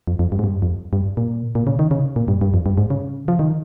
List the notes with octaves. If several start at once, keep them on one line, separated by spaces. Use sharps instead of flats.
F2
F2
G2
G#2
G2
F2
G2
A#2
A#2
C#3
D#3
C#3
A#2
G2
G2
F2
G2
G#2
C#3
F3
D#3